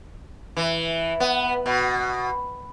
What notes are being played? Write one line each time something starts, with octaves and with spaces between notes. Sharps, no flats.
E3
B3
B2